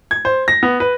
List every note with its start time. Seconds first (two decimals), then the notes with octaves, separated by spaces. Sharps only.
0.11 G#6
0.25 C5
0.48 A#6
0.63 B3
0.80 B4